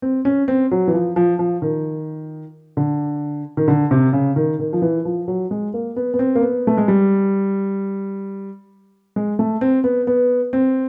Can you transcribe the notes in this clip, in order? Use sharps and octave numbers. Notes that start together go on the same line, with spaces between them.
C4
C#4
C4
F#3
E3
F3
F3
F3
D#3
D3
D#3
D3
C3
C#3
D#3
D#3
F3
E3
F3
F#3
G#3
A#3
B3
B3
C4
A#3
B3
A3
G#3
G3
G#3
A3
C4
B3
B3
C4